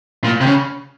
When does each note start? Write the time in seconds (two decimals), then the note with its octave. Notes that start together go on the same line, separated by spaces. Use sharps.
0.24 A#2
0.41 C3
0.46 C#3